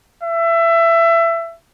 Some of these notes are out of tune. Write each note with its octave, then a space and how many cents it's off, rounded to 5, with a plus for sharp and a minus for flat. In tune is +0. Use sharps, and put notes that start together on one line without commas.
E5 +20